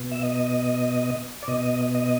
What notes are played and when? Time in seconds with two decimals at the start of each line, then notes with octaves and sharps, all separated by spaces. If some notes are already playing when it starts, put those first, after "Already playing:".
Already playing: B2
0.12 E5
0.23 D#5
1.43 D5
1.48 B2 D#5
1.95 D#5